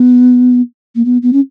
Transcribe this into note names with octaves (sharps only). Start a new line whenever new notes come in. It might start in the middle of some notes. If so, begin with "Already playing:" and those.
Already playing: B3
A#3
B3
B3
C#4